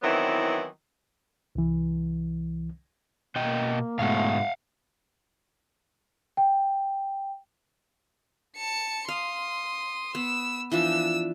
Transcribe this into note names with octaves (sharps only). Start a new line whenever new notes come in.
D#3 E3 F#3 B3 C4 E4
C2 E3
B2 A#3 D#5 G5
G#2 B2 A3 F5 F#5
G5
A5 C#7
F5 C6 D#6
B3 E6
E3 F3 D4 E6